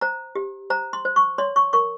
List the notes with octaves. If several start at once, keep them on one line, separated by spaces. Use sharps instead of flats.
C5 A#5
G4
C5 A#5
C6
C5
C#6
C#5 C6
C#6
A#4 C#6